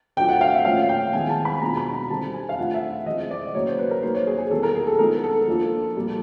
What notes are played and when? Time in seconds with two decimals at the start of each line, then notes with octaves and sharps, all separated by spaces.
0.17 A2 F#3 A3 D4 F4 G5
0.29 F#5
0.41 F5
0.53 E5
0.65 A#2 F3 A3 C#4 F5
0.89 G5
1.13 D#3 G#3 B3 E4 G#5
1.29 A5
1.45 B5
1.61 B2 G#3 B3 D4 F4 A#5
1.77 B5
1.94 A#5
2.10 D3 G3 C4 D#4 A5
2.34 G#5
2.49 F5
2.58 F3 A3 D4 F4 F#5
2.74 E5
3.06 E3 G#3 C4 D#5
3.31 D5
3.54 C#3 F#3 A#3 C#5
3.67 C5
3.78 B4
3.91 A#4
4.02 F#3 A#3 D#4 C5
4.15 C#5
4.27 G#4
4.39 G#4
4.51 E3 G3 B3 A4
4.63 A#4
4.75 G#4
4.87 A4
4.99 F3 G#3 B3 D#4 A#4
5.24 A4
5.47 F3 A#3 D4 F4
5.96 A#2 G3 A#3